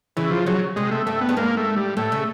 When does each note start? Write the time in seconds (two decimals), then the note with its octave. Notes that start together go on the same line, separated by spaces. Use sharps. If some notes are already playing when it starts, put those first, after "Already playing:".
0.17 C#3 E3
0.31 F3
0.46 C#3 F#3
0.76 C3 G#3
0.91 A3
1.06 G2 A3
1.21 B3
1.29 G2
1.37 G#2 A#3
1.57 A3
1.76 G3
1.97 A2 A3
2.12 C#3